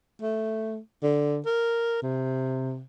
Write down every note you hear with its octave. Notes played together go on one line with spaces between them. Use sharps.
A3
D3
A#4
C3